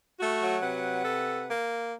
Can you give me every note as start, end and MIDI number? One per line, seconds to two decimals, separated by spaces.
0.20 0.56 57
0.20 0.56 66
0.42 1.00 54
0.63 1.48 48
0.63 1.48 71
0.63 1.48 78
1.04 1.42 69
1.50 1.94 58